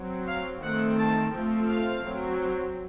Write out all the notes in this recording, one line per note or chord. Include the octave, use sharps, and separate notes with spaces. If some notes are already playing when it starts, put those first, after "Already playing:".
Already playing: F#3 C4
F5
D#3 A3 C4 F#5
A5
F3 A3 C4
F5
F#3 C4